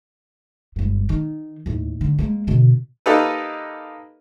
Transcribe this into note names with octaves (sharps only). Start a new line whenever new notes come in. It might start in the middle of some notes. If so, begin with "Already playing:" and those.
G1 G#2
D#3
D#2 A2
D3
G#3 A#3
B2 D3
A#3 D#4 G4 A4 B4